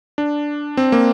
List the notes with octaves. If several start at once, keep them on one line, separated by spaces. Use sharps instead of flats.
D4
C4
A#3